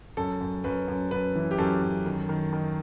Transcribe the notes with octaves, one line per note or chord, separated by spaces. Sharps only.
F#2 A4
F#2
F#2 B4
F#2
F#2 B4
E3
G4
F#2 A4
F#2
D#3
D#3
D#3